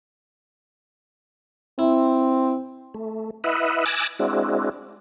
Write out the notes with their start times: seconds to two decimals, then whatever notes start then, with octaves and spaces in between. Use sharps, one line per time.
1.79 C4 E4
2.94 A3
3.44 E4 B4 D#5 E5 F#5
3.85 G#5 D6 E6 F#6 A6 A#6
4.19 G#3 C4 D4 E4 F#4